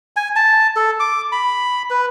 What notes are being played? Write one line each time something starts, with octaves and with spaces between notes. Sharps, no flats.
G#5
A5
A4
D6
B5
B4